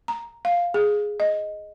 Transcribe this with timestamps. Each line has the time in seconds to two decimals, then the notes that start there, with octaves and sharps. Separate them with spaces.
0.08 A#5
0.45 F5
0.74 G#4
1.20 D#5